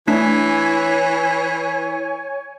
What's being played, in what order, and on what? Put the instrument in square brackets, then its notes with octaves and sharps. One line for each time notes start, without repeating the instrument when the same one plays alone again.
[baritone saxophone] E3 [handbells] A3 D4 B6 [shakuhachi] C#5 [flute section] G#5